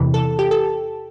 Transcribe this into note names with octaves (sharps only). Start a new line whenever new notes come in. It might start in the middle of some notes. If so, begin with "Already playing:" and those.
Already playing: E2 C3 E3
A4
G4
A4